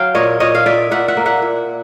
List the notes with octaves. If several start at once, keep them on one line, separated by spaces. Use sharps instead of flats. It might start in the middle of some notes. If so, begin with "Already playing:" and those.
Already playing: F#3 F5 G5
A#2 C#5 D#5
A#2 C#5 D#5
F5
A#2 D5 E5
A#2 E5 F#5
E5 F#5
A#3
E5 F#5
A#2